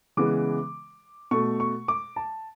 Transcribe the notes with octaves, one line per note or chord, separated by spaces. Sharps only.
C#3 E3 G#3 B3 D6
B2 A3 C#6
C#6
D6
A5